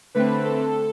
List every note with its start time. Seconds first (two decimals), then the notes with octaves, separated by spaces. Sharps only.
0.14 D3 A3 C4 B4
0.44 A4